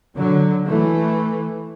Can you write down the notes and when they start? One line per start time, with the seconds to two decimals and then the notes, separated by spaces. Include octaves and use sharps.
0.16 D3 F#3
0.66 E3 A3